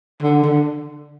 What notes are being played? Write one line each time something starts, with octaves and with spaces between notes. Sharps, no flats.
D3
D3